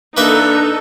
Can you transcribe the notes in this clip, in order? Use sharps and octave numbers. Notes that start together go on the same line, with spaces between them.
E3 A#3 D4 D#4 A4 E5 F#6